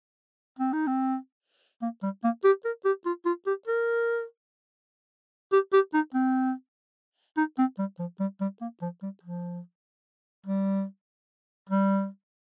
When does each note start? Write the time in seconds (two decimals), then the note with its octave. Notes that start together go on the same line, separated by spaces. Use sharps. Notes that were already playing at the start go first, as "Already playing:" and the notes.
0.59 C4
0.73 D#4
0.87 C4
1.82 A#3
2.03 G3
2.24 A#3
2.44 G4
2.65 A#4
2.85 G4
3.05 F4
3.26 F4
3.46 G4
3.67 A#4
5.52 G4
5.73 G4
5.94 D#4
6.14 C4
7.37 D#4
7.58 C4
7.78 G3
7.99 F3
8.20 G3
8.41 G3
8.61 A#3
8.82 F3
9.02 G3
9.23 F3
10.46 G3
11.69 G3